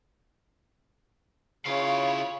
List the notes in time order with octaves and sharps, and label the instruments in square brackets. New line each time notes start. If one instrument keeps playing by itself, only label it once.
[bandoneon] C#3 [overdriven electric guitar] E4 F5 [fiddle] F4 B5 [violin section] C#5